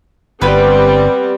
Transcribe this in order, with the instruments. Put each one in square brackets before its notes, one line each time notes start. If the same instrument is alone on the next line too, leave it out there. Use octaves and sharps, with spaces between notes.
[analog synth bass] G1 [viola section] G3 C4 G4 [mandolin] B3 B4